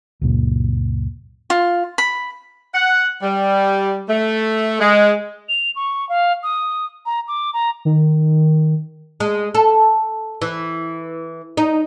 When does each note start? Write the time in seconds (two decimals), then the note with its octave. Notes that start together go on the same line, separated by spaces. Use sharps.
0.22 C#2 F#2 A#2
1.50 F4
1.98 B5
2.75 F#5
3.22 G3
4.09 A3
4.80 G#3
5.49 F7
5.76 C#6
6.09 F5
6.43 D#6
7.06 A#5
7.28 D6
7.53 A#5
7.85 D#3
9.20 G#3
9.54 A4
10.42 E3
11.57 D#4